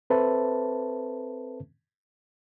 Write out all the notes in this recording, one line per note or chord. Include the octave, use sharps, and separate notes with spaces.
C4 A4 B4 C5 E5 A5